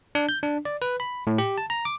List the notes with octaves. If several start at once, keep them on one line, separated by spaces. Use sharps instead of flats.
D4
G6
D4
D5
B4
B5
A2
G4
A5
A#5
D6